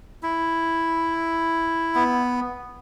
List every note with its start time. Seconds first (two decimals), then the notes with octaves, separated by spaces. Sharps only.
0.23 E4
1.95 B3